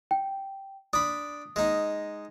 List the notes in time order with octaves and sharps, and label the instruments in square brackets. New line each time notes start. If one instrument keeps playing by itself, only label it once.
[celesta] G5
[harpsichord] D4 B5 [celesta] D#6
[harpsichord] G#3 D#4